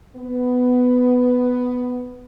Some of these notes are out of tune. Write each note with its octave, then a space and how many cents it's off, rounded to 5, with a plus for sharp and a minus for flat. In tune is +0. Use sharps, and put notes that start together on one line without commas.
B3 +10